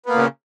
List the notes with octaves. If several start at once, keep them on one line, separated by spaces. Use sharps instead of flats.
A#2 C#3 A#3 B3